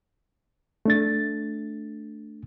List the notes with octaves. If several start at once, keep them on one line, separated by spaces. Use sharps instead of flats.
A3 D4 A6